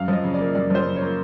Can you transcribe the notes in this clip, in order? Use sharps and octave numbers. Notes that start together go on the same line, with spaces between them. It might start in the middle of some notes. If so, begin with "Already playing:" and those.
Already playing: F#2 F5
F3 D#5
C#3
A#3 D5
F#2 D5
F3 C5
C#3
C#5
A#3